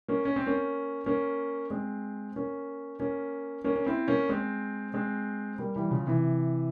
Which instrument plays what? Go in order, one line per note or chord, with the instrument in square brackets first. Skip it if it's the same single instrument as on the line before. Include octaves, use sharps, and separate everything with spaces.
[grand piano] A#3 C#4
C#4
C4
A#3 C#4
A#3 C#4
G#3 C4
A#3 C#4
A#3 C#4
A#3 C#4
C#4
C4 E4
A#3 C#4
G#3 C4
G#3 C4
G3 A#3
E3 G3
C#3 F3
C3 E3